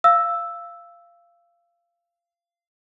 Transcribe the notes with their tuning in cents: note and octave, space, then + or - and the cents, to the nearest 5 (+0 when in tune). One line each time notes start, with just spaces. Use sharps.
F5 -20 E6 +0